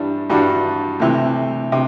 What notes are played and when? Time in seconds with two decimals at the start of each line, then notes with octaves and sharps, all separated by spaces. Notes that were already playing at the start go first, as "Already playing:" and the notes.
Already playing: G2 E3 G3 D4
0.30 G2 E3 G3 D4 F#4
1.00 D2 C3 E3
1.72 C3